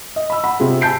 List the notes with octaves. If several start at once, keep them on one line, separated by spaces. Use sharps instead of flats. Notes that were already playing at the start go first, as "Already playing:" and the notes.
D#5
B5 E6
F#5 B5
C3 C4 F4 G#4
G#5 A5 G6 C7 D7